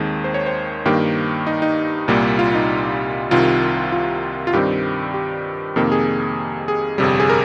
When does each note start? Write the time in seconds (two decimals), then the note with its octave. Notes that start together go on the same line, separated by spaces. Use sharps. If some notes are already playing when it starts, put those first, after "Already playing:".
Already playing: D#2 D#3 G#3 C4
0.24 C5
0.34 C#5
0.46 C5
0.85 G2 D#3 A#3 G4
1.47 D#4
1.62 D#4
2.08 C2 A#2 G3 A#3
2.39 F4
2.54 D#4
3.31 C2 C3 D#3 F4
3.92 F4
4.47 F4
4.53 G2 D#3 G3 C4 G4
5.14 G4
5.76 F2 C3 D#3 A#3
5.92 G#4
6.68 G#4
6.98 G1 F2 C3 G3
7.20 G#4
7.30 A#4